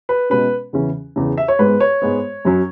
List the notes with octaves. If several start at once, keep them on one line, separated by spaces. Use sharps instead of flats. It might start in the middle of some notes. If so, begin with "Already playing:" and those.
B4
B2 G#3 C#4 B4
E2 C#3 E3 C#4
E2 C#3 E3 C#4
E5
C#5
G#2 G#3 B3 B4
C#5
G#2 G#3 B3
F#2 F#3 C#4